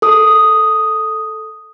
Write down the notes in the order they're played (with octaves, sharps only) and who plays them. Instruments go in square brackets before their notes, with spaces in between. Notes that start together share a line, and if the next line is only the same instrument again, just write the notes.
[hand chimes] A4 D#6